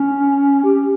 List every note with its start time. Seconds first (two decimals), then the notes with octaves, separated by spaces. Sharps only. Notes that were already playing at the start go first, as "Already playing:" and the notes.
Already playing: C#4
0.64 G4